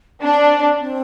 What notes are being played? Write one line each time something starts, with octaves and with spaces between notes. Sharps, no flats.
C4 D4
C4